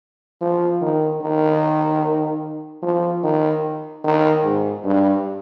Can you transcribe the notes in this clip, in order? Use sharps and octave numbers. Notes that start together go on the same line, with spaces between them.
F3
D#3
D#3
F3
D#3
D#3
G#2
G2